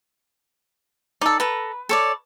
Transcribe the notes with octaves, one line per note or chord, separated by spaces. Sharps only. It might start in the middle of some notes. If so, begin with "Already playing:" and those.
D#4 A4 D5
A4 B4 A#5
A4 C#5 D5